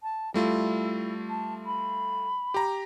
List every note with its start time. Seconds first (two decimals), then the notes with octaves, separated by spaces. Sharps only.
0.03 A5
0.34 G3 A3 E4 F4
1.30 A5
1.66 B5
2.54 G4 A#5